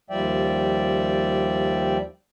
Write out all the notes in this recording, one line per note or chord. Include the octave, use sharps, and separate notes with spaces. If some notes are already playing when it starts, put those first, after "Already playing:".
D#2 F3 G3 D5 E5 G5